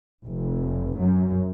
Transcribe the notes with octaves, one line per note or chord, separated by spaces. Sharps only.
F1
F#2